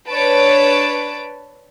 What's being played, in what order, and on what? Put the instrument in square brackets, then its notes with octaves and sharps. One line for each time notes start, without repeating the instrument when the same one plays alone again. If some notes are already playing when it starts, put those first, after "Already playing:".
[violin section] D4 B4 C#5 A5 D7